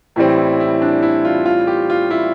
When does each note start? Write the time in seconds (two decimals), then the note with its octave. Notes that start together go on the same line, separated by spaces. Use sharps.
0.16 A2 E3 G3 C4 E4
0.38 E4
0.60 E4
0.82 D4
1.02 E4
1.25 F4
1.46 F4
1.67 G4
1.90 F4
2.11 E4